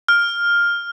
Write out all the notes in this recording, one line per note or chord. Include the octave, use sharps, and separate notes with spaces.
F6